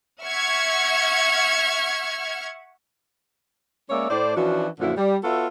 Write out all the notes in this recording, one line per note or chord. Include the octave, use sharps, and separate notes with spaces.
E5 F#5 C#6 F6 G#6
G#3 A#3 C#4 C#5 D5 E5
A2 C5 D5
E3 F3 C#4 D4 F#4
F#2 A#2 D3 F3 E4 F#4
G3
B3 F4 F#4 A4 C#5 E5